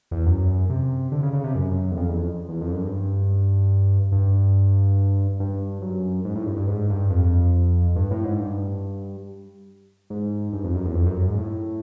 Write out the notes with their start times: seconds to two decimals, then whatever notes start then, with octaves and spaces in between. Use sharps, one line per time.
0.11 E2
0.26 F#2
0.70 C3
1.12 D3
1.23 C#3
1.33 C#3
1.44 C3
1.55 F#2
1.91 E2
1.97 F2
2.09 E2
2.18 F2
2.49 E2
2.61 F2
2.72 F#2
2.83 G2
4.12 G2
5.40 G2
5.82 F#2
6.25 G#2
6.35 A2
6.46 G2
6.56 G2
6.68 G#2
6.90 G2
7.10 F2
7.96 G2
8.11 A2
8.24 G#2
8.39 G2
10.10 G#2
10.53 G2
10.64 F2
10.75 F#2
10.85 E2
10.95 F2
11.06 F#2
11.17 F#2
11.28 G#2
11.38 A2